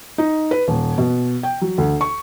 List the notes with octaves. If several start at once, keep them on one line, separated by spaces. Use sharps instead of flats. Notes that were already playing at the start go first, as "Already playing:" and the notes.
D#4
B4
D#1
B2
G5
F#3
D2
C#6